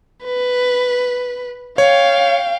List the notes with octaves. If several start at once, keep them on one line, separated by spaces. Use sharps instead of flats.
B4
C#5 F5 G5